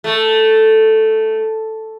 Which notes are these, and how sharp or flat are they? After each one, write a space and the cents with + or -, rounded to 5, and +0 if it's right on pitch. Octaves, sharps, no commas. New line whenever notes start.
A3 +0